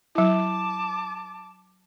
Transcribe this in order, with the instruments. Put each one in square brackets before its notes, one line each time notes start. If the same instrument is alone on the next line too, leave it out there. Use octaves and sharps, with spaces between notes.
[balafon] F#3 E4 [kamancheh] A5 D6